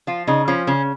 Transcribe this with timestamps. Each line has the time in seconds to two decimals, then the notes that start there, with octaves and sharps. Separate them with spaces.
0.07 F3 F4
0.27 C#3 D#4
0.48 F3 C#4
0.67 C#3 C#4